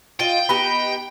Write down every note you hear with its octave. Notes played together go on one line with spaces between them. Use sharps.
F4 D#5 G5
B3 D#4 G4 B5